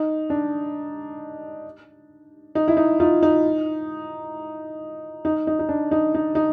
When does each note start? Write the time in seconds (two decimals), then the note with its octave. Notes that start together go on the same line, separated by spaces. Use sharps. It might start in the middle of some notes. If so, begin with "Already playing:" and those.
Already playing: D#4
0.30 D4
2.55 D#4
2.68 E4
2.77 D#4
3.00 D#4 F4
3.23 D#4
5.25 D#4
5.47 D#4
5.59 D#4
5.69 D4
5.91 D#4
6.15 D#4
6.35 D#4